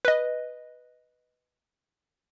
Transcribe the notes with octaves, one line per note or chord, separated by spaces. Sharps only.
B4 D#5